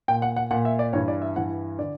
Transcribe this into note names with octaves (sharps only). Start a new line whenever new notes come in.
A#2 G5
F#5
F#5
A#2 F#5
E5
D5
G2 E3 C#5
D5
E5
G2 E3 F#5
D3 D5